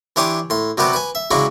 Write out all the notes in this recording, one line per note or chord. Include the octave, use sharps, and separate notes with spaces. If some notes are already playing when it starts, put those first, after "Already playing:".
E3 D4 G4 C#5 C6 D#6
A2 C6
C3 F#3 G3 B3 G4 B4
B4 G#5
E5
C#3 F#3 G#3 D4 E4 F#4